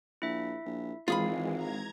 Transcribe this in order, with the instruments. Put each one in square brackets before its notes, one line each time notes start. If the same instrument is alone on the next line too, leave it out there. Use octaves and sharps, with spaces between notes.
[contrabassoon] A#1 [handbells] E4 E5
[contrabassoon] A#1
[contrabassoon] G#1 [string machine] E3 G#3 [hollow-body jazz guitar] F4 G#4 B5 [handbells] F5
[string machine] A#5 G#6